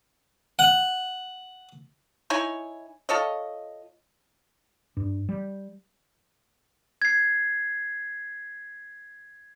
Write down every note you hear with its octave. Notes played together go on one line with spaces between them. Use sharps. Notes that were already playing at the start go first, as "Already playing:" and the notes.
F#5
D#4 E4 C#5 G#5
F4 A4 C#5 D#5
G2
G3
G#6 C7